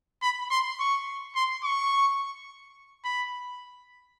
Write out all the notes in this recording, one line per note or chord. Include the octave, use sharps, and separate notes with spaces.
B5
C6
C#6
C6
C#6
B5